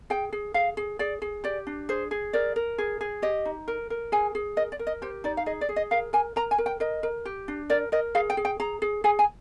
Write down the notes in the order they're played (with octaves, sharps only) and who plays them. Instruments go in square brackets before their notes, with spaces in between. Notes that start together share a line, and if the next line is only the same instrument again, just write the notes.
[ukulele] G#4 G5
G#4
G#4 F5
G#4
G#4 D5
G#4
G4 D5
D4
G#4 C5
G#4
A#4 D5
A#4
G#4
G#4
G4 D#5
D#4
A#4
A#4
G#4 G#5
G#4
A#4 D#5
D5
A#4
D#5
G4 C5
D#4 D5
F5
G#4 D#5
D5
G#4
D#5
A#4 F5
A#4 G#5
A#4 A#5
G#5
A#4
G5
A#4 D#5
A#4
G4
D4
A#4 D5
A#4 D#5
G#4 F5
G5
G#4
G5
G#4 A#5
G#4
G#4 G#5
G#5